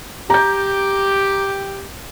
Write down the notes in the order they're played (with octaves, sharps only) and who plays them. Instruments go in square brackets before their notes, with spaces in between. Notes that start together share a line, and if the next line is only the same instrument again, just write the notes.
[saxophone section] G4 [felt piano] A#5 G6